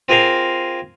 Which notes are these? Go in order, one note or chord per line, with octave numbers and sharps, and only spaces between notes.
C4 F4 G#4 A#4 C5 F5